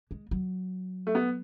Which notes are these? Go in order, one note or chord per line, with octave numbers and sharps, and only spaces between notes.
G#3
F#3
A3
B3